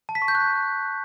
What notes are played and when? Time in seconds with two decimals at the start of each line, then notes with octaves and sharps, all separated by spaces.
0.09 A5
0.15 B6
0.22 C#6
0.28 G6
0.35 F#6